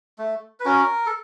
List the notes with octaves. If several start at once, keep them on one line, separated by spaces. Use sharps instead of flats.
A3
B4
C#4 F#4 A#4
A4